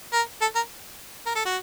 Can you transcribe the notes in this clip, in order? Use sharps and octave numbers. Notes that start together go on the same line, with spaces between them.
A#4
A4
A#4
A#4
A4
F#4